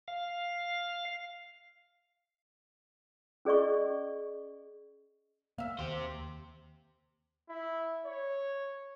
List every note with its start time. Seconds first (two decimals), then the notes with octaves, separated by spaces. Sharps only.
0.08 F5
3.45 C#4 G#4 D5 D#5 C#6
5.58 A#3 E5 F5
5.79 D#2 G4 C5
7.49 E4
8.05 C#5